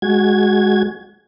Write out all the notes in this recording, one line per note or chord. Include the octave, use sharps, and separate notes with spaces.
G#3 F#4 G#6